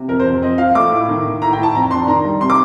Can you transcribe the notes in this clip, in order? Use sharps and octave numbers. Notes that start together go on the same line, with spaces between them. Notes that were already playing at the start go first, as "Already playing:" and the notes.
Already playing: C3
F2 A#4
C5
F2
C4 D#5
F3 F5
A3 D6
A2
D#3
D#3
A2 A#5
A2 G5
A5
F2 A#5
D4 C6
D#3 A#5
G3
C3 C6
D6